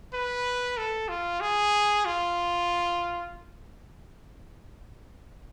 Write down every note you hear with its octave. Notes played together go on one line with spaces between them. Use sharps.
B4
A4
F4
G#4
F4